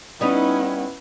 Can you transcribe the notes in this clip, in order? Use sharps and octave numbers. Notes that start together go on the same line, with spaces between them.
G3 B3 C#4 D#4 E4